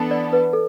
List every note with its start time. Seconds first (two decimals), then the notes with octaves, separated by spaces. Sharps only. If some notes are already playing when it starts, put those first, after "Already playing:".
Already playing: E3 B3 D4 A4
0.11 D5
0.33 B4
0.53 A4